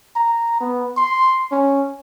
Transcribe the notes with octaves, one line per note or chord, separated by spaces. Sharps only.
A#5
B3
C6
C#4